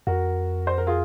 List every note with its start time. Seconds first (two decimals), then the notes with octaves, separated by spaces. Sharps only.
0.07 F2 F#4 A#4
0.67 C5
0.78 A#4
0.87 F4 G#4